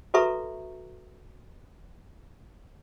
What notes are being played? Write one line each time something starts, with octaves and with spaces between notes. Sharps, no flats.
F#4 A4 B4 E5 A#5 C#6